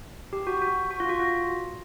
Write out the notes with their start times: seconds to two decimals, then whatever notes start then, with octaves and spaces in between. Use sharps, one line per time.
0.33 G4
0.47 F#4
0.62 F#4
0.91 F#4
1.00 F4
1.09 F#4
1.19 F4